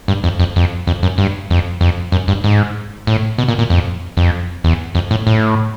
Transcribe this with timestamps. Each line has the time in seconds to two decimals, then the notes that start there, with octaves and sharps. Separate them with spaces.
0.08 G2
0.24 F2
0.40 F2
0.56 F2
0.87 F2
1.03 F#2
1.18 G2
1.50 F2
1.81 F2
2.12 F#2
2.28 G2
2.44 G#2
3.07 A2
3.38 B2
3.48 A#2
3.59 A#2
3.70 F2
4.17 F2
4.64 E2
4.95 F2
5.11 A2
5.27 A2